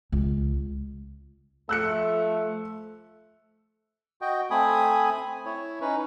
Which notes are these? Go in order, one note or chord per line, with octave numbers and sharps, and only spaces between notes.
C#2
F3 A3 E6 F#6 C#7
F#4 D#5 G5
A3 C4 G#5 B5 D#6
E4 C#5
C#4 D#4 B4